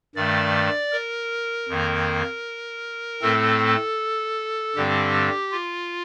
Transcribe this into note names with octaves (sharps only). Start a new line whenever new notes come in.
G2 D#3 A3 D5
A#4
F2 D#3 A#3
A2 A3 C4 A4
G2 D3 G3 C4 G4
F4